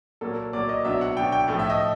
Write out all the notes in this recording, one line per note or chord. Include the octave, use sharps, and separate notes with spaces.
A#2 F#3 A#3 A4
A#2 F#3 A#3 D5
D#5
B2 F#3 B3 D4 E5
F#5
B2 F#3 B3 D4 G5
G5
A2 F3 A3
E5
D#5